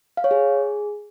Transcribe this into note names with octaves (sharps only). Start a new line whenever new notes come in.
F5
C#5
G#4